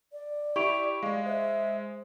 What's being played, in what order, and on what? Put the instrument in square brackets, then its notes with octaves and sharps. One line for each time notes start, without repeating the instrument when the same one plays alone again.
[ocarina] D5
[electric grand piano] E4 G4 [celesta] C#6 D7 F7
[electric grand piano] G#3 [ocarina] D5 [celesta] F5
[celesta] C5 [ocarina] E5